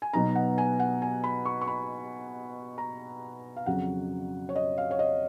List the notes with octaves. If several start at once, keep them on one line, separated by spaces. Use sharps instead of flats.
G#5
B2 F#3 B3 D#4 A#5
F#5
G#5
F#5
G#5
B5
C#6
C#6
B5
A#5
F5
F2 C#3 F#3 F#5
C#5
D#5
F5
C#5
D#5